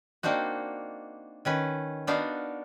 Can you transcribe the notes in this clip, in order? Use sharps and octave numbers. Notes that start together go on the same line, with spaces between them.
A#3 C4 D4 D#4 F#4
D#3 C#4 B4
B3 D4 D#4 F#4 F5